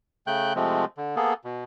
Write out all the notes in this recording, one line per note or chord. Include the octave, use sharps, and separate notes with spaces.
C#3 A3 G5 F#6 G6
C3 F3 G#3 A3 C4
D3
A#3 B3 G#4 A4
B2